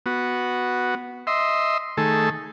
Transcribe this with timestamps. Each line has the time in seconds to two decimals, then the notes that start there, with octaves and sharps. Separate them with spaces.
0.06 B3 F#4
1.27 D#5 E5 C6
1.97 D#3 A3 G#4 A4